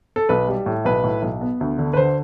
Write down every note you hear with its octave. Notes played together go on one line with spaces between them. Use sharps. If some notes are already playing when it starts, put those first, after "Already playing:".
A4
B1 B4
G3
A2
B1 B4
A2
B1
B3
D2
D3
B4
D3 C5